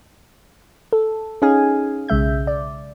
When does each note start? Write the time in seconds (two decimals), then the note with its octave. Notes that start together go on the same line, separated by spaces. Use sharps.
0.93 A4
1.42 C#4 D#4 G#4 F5 G#5
2.09 B1 C#3 G#3 E5 G6
2.47 D5